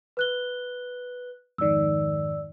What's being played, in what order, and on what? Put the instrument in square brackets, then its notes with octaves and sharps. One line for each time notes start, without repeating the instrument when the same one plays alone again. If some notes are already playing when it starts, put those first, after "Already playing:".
[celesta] B4 F#6 G7
[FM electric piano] F2 G#2 D#3 [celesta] D5 E6